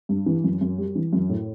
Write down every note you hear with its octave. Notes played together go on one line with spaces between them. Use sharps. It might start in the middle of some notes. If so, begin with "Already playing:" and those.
G2
E3
F#2
F#2
G3
E3
F#2
A2